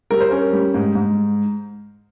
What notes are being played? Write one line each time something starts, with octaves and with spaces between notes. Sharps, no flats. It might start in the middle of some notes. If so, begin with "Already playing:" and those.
G3 A#4
C5
C#4 A#4
G3
G#2
G#2